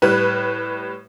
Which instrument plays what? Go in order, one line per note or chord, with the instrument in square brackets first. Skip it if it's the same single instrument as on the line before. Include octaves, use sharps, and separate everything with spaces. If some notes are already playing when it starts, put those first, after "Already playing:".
[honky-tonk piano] A2 G3 B4